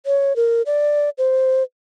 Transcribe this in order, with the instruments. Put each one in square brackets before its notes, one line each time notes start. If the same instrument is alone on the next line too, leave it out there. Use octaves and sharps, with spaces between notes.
[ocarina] C#5
A#4
D5
C5